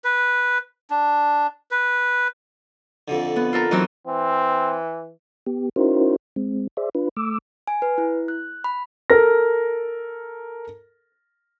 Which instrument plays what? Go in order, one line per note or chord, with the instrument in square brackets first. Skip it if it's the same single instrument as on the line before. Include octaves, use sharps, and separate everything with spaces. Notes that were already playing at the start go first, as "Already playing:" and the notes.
[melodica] B4
D4
B4
[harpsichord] F2 D3
[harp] B3
F4 A4 A#4
[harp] E3 F#3 C4 [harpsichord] D#4
[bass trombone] E3 [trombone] C4
[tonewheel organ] B3 G4
C#4 D#4 E4 F#4 A#4 C5
G#3 C4
G#4 C5 D5 E5
D4 F4 B4
A3 D6 E6
[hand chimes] G#5
B4
E4
F#6
B5
[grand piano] A4 A#4 A#6